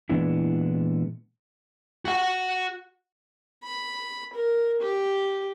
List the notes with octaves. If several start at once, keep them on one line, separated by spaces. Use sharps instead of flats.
A#2 E3 G#3 B3 D4 E4
F#4 F#5
B5
A#4
G4